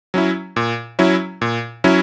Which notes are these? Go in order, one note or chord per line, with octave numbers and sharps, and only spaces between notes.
F#3 C#4 E4
A#2
F#3 C#4 E4
A#2
F#3 C#4 E4